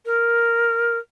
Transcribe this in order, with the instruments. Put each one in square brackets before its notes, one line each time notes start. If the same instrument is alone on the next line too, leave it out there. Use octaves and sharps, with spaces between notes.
[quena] A#4